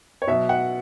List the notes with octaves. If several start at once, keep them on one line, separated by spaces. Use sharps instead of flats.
C#5
B2 F#3 E5
F#5